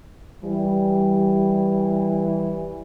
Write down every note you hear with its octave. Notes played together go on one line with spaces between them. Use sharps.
E3 G3